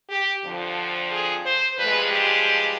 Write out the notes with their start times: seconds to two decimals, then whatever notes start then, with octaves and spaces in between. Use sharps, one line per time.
0.10 G4
0.44 F2 D3 F3
1.12 G#4
1.45 C5
1.79 G2 F3 G#3 B4
2.12 G4